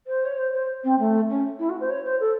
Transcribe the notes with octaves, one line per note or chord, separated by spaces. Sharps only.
C5
C#5
C5
C5
C4
A3
C#4
E4
F#4
C5
C#5
C5
A4